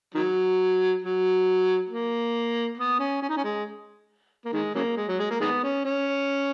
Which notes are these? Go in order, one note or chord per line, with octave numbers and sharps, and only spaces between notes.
D#3 F#3
F#3
A#3
B3
C#4
C#4
D#4
C#4
G#3
A#3
D#3 G#3
C#3 F#3 A#3
G#3
F#3
G#3
A#3
D#3 G#3 B3
C#4
C#4